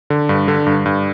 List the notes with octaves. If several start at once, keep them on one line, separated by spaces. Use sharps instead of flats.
D3
G2
D3
G2
G2